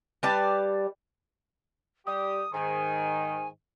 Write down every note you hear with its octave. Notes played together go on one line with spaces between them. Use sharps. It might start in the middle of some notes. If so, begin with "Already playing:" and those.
G3 B4 D5 A5
G3 G4 D#6
G#2 D#3 G#5